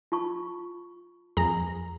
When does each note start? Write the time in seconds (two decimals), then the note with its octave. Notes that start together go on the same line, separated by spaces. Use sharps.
0.12 F4 A5 C#6
1.37 F2 G#4 A#5